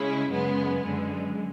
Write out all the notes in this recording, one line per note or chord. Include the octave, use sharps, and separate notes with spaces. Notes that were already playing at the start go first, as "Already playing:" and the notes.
Already playing: C#3 G#3 C#4 E4
F#2 C#3 G#3 B3
F#2 D3 G#3